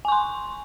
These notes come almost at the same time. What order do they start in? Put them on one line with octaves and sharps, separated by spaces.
G#5 C#6 C6